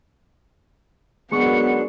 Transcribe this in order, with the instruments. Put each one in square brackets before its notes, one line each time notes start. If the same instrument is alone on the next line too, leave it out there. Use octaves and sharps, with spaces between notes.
[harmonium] F#2 D4 [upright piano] G#3 C#6 [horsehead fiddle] B3 [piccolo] C#7